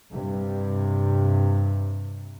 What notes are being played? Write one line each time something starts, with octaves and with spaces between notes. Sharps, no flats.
G2 C3